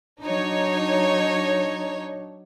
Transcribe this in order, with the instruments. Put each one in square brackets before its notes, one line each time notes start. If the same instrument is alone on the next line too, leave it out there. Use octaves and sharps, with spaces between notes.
[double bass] F#3 D4 [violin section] D#4 C#5